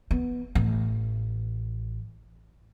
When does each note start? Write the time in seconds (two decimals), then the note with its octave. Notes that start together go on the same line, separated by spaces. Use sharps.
0.11 B3
0.55 A1